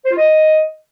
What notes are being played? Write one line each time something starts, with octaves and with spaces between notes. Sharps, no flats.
C5
F4
D#5